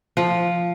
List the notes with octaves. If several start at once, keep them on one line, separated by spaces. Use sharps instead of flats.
F3